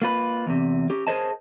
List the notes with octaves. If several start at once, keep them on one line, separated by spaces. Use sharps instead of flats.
A#3 F4 B4
E2 C3
C#4 G4
G#4 A#4 C5 C#5 D#5 A5